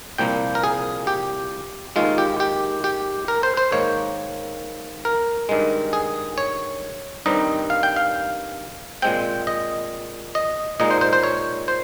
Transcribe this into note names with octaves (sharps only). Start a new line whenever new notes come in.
C2 A#2 F3 A#3 G5
A#4
G#4
G4
D#2 D#3 G#3 F4
G4
G4
G4
A#4
C5
C5
G#2 D#3 A#3 C#5
A#4
G2 D#3 G#3
G#4
C#5
G2 D#3 G3 C4 D#4 D#5
F5
G5
F5
A#2 G#3 C4 G5
D#5
D#5
A#2 G#3 D#4 D#5
C5
C5
C5
C#5
C5